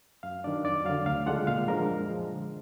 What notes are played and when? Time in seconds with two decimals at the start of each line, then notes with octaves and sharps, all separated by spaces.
0.23 F#2 F5
0.44 D#3 F#3 D4 D5
0.64 F2 D5
0.85 D3 F#3 F5
1.06 D2 F5
1.26 D3 G#3 D4 F4 F#5
1.47 A#2 F5
1.68 F3 G#3 D4 A#4
1.89 F#2
2.10 F3 G#3
2.30 D3